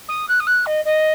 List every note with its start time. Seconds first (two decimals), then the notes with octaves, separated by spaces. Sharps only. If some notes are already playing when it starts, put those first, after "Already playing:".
0.08 D#6
0.28 F#6
0.40 D#6
0.47 F#6
0.66 D#5
0.85 D#5